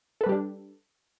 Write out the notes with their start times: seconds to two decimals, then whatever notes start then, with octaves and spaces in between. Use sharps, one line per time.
0.21 A4
0.23 B4
0.26 G3
0.29 G4
0.32 D4